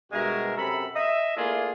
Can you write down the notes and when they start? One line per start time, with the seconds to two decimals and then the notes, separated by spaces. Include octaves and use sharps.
0.12 G2 B2 G#3 F#4 A#4 E5
0.57 F#2 C3 A4 A#5 B5
0.96 D#5 E5
1.37 A3 A#3 D4 E4 F4 G#4